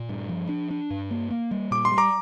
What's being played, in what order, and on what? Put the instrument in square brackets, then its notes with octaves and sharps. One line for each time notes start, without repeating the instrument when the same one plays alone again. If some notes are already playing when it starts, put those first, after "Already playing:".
Already playing: [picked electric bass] A#2
G2
F3
D4
D4
G2
A#3
A#3
G3
[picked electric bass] A#2 [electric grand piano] D6
[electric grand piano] C6
[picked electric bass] G3
[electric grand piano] A#5 D6